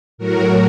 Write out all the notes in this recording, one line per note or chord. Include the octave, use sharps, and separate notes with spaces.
A2 F#3 F#4 A#4